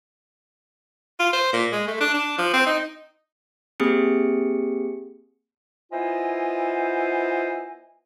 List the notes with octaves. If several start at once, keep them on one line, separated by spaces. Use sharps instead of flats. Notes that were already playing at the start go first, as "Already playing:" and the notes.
F4
C5
A#2
G#3
A3
D4
D4
F3
C4
D#4
A#3 C4 G4 G#4 C#7
B3 E4 F4 C5 D#5 G#5